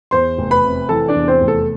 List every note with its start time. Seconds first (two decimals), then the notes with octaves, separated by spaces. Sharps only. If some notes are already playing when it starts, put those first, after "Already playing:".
0.11 E2 C5 C6
0.38 F1
0.51 B4 B5
0.64 C3
0.89 E3 A4 A5
1.08 D4 D5
1.15 E2
1.28 C4 C5
1.41 F1
1.48 A4